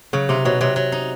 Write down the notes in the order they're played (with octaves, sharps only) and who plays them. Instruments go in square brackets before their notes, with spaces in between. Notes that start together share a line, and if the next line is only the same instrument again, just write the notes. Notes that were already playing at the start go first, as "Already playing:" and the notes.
[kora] C#3 [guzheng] F#3
[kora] C3 [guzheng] D#4
[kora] B2 [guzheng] F#3
[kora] C3 [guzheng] F#3
[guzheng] F#3
D#4